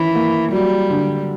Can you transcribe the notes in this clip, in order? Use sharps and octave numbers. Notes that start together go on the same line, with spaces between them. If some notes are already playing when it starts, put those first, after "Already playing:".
Already playing: D#3 E3 C#4
A#3
F#3 G3
D3